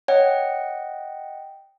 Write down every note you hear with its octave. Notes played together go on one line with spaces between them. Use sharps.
C#5 D#5 F#5 G5